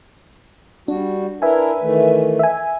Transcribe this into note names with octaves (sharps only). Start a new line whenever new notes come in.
G3 D4 F#4
D4 E4 A#4 B4 E5 G#5
D#3 E3 A3
E5 G#5